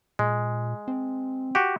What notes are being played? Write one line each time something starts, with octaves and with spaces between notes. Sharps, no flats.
A#2 G#3
C4
F#4 G4